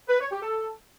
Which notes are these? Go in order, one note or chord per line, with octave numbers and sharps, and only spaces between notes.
B4
C#5
G4
A4